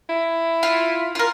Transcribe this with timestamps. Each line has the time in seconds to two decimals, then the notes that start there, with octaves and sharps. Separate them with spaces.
0.09 E4
0.63 F4
1.15 F4 A#4